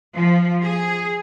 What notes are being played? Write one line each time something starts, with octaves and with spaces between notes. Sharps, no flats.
F3
G#4